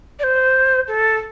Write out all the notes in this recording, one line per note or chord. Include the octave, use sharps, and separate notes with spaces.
D5
C5
A4